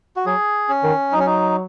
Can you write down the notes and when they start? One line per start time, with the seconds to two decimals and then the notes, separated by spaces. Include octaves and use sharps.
0.16 F#4
0.26 F#3 G#4
0.69 C#4
0.83 D#3
1.12 F#3 D#4
1.19 C#4
1.26 D#4